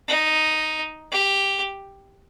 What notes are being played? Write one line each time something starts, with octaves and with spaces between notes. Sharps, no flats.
D#4
G4